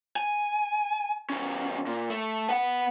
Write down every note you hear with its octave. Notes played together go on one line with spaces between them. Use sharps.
G#5
E2 C#4
A#2
A3
B3 F#5